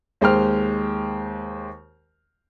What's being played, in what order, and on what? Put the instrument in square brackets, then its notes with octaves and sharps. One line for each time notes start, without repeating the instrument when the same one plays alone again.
[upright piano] D#2 G#3 C5 G5 F6